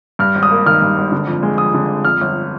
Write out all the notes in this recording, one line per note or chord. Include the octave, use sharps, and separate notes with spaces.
G2 F6
G#1
D#6
A#3
D#3 F6
G2
G#1
D3
F2
G#3
F3 D#6
D3
F2
F2 F6
G1